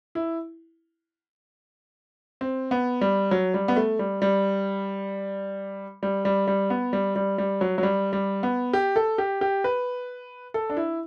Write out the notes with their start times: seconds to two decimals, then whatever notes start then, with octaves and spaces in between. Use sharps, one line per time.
0.15 E4
2.41 C4
2.71 B3
3.01 G3
3.31 F#3
3.54 G3
3.68 B3
3.76 A3
3.99 G3
4.22 G3
6.03 G3
6.25 G3
6.47 G3
6.70 B3
6.93 G3
7.16 G3
7.38 G3
7.61 F#3
7.78 F#3
7.83 G3
8.13 G3
8.43 B3
8.73 G4
8.96 A4
9.18 G4
9.41 G4
9.64 B4
10.54 A4
10.70 D4
10.77 E4